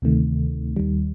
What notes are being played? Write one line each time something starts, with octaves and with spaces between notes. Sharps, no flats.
D2 C3 D#3 A3
D#2 D#3 G3